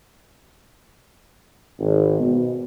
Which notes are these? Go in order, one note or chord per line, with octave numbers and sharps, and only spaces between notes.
G#1
B2